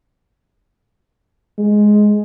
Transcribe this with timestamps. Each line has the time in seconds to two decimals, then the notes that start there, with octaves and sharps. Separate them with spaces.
1.58 G#3